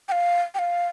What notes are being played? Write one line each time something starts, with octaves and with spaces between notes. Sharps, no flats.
G5
F5
G5
F5